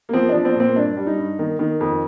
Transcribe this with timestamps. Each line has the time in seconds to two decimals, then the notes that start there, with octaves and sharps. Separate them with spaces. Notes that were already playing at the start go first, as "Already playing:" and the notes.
0.09 A#3
0.13 F3 C4
0.29 F3 D4
0.45 C4
0.55 A#2 C4
0.75 G2 D4
0.97 G3
1.07 D#4
1.17 G2
1.39 D#3
1.59 D#3
1.81 F2